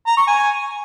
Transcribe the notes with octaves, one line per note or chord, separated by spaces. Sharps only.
A#5
C#6
G#5